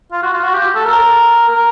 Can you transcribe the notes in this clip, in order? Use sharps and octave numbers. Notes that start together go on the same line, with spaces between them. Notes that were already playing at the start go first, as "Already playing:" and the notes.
F4
F#4
F4
F#4
G4
A4
A#4
A#4